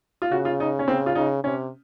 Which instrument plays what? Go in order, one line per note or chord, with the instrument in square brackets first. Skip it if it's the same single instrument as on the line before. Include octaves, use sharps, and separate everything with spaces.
[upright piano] F4
[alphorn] C#3 [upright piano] F#4
[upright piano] F4
D#4
C#4
[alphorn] C#3 [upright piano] C4
[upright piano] F4
[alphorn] C#3 [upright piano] D#4
[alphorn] C3 [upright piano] C#4